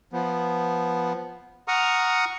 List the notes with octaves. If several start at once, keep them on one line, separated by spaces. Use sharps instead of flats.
F3 B3
F#5 A#5 C#6 D#6 F6